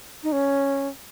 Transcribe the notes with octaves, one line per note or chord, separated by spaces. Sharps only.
D#4
C#4